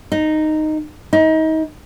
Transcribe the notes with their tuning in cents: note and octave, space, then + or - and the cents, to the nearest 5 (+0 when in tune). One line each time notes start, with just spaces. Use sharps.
D#4 -10
D#4 +30